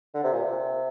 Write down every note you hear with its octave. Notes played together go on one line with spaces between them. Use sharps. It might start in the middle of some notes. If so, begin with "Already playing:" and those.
D3
C3
A#2
C3